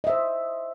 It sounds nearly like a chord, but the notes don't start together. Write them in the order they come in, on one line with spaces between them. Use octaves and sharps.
D#5 E5 C5